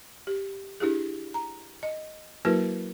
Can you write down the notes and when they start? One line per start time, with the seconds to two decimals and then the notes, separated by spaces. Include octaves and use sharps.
0.27 G4
0.80 D4 E4 G4 G#4
1.34 A#5
1.83 D#5
2.45 F#3 A#3 E4 F#4 A#4 B4